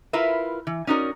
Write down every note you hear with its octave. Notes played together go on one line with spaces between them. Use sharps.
E4 F4 A#4 B4 E5
E3
C#4 D#4 F#4 A#4 D5